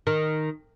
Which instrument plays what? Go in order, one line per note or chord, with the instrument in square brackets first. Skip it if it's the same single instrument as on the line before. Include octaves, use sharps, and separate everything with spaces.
[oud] D#3